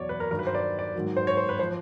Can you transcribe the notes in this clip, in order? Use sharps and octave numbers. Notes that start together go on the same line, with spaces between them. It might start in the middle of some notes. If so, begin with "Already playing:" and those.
Already playing: E2 B2 F#3 C#5 D5
B4
A#4
G2 D#3 F#3 A#4
B4
C5
D5
D5
G#2 D#3 F#3
C5
C#5
C5
B4
F3 C5